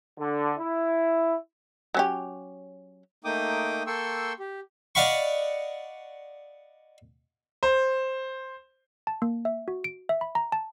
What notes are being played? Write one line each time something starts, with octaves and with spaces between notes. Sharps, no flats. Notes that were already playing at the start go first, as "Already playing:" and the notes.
D3
E4
F#3 C#4 G4
A3 A#3 D#4 G5 D6 D#6
A#3 A4 G5 C6 C#6 E6
G4
D5 D#5 F5 F#5 B5 C#6
C5
A5
A#3
E5
F#4
D7
E5
B5
A#5
A5